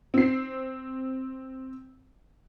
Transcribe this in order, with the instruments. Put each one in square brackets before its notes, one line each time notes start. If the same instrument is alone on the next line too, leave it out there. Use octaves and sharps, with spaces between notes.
[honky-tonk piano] C4 C7